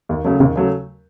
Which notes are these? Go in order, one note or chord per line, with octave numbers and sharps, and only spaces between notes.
D#2
C#3 F#3 A3
D#2 C#3
C#3 F#3 A3